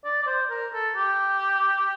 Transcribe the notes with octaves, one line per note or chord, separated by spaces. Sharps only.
D5
D5
C5
A#4
A4
G4